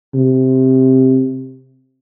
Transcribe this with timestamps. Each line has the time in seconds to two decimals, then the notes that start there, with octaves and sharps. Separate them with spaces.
0.15 C3